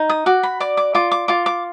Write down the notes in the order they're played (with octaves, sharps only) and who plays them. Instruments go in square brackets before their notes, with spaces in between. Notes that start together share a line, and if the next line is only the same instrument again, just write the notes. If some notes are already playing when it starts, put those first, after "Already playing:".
Already playing: [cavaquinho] D#4
D#6
F#4 D6
B5
D5 D6
D6
F4 D6
D6
F4 D6
D6